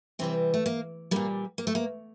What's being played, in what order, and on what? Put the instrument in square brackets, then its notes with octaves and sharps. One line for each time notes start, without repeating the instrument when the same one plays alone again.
[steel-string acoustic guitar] C3 E3 G3 C4
A3
A#3
A#2 G3 A#3
A#3
A3
A#3